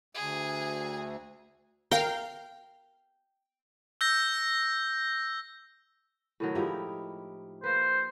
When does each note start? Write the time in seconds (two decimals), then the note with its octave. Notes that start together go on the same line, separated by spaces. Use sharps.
0.15 D2 G#4
1.91 A#4 F5 G5
4.01 E6 G6 A#6
6.40 A2 D#3 F#3
6.55 F3 G#3 D#4 E4 G4
7.64 A#3 B4 C5